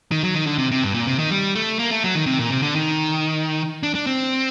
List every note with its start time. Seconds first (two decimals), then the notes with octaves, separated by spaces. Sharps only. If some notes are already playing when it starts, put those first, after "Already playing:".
0.11 D#3
0.23 F#3
0.34 D#3
0.46 D3
0.58 C3
0.72 C3
0.84 G2
0.94 A#2
1.07 C3
1.19 D#3
1.31 G3
1.55 A3
1.79 A#3
1.91 A3
2.04 F#3
2.15 D#3
2.26 C3
2.39 A#2
2.50 C3
2.62 D3
2.75 D#3
3.83 D4
3.95 D4
4.07 C4